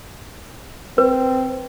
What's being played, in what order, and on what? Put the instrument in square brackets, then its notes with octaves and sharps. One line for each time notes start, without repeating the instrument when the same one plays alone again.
[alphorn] C4 [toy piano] B4